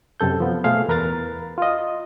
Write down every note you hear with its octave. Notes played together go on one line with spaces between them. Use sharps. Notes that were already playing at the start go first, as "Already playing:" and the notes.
F#2 C3 A4 G6
F3 B3
B2 A3 G#4 C5 F5
E2 A#4 B4 A#5 A6
F4 D#5